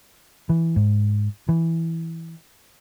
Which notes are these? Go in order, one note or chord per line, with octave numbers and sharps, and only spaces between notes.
E3
G#2
E3